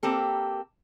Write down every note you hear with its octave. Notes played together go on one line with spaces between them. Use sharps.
A#3 C4 G4 A4 A#4